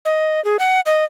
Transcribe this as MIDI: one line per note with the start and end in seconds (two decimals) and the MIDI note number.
0.05 0.43 75
0.45 0.57 68
0.59 0.81 78
0.86 1.04 75